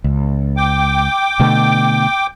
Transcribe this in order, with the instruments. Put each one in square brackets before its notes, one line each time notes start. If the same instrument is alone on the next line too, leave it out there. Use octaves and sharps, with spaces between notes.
[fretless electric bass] C#2
[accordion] G5 D6
[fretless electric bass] B2 D3 A3